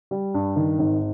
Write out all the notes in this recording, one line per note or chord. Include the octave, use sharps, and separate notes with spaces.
G3
G2
D#3
G#1